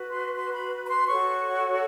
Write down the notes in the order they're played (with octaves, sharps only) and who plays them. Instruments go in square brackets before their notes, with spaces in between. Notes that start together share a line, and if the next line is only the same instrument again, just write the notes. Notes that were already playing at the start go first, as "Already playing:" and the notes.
Already playing: [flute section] F#4 B4
C6
C6
B5
B5
C6
F#4 A4 C#5 C#6